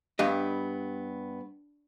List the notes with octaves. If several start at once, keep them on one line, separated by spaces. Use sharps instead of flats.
G2 B3 G4 D#5